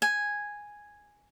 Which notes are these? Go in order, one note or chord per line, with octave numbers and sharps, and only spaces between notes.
G#5